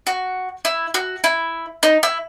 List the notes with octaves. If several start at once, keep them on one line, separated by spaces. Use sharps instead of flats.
F#4
E4
F#4
E4
D#4
E4